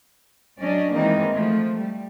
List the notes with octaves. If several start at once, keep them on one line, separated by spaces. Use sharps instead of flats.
F#3 C#4 D4 D5 D#5
D#3 E3 G#3 A#3 C4 D#4
F3 A3
G3